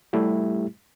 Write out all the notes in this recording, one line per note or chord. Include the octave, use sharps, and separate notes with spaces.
G3 A3 E4 G4